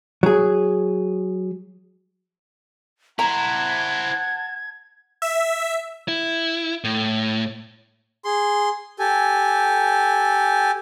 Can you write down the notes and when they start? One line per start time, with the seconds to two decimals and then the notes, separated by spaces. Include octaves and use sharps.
0.23 F#3 G#4
3.19 E4 C5 F#5 A5 A#5 G#6
5.22 E5
6.08 E4
6.84 A2
8.24 G#4 C6
8.99 G4 A4 G#5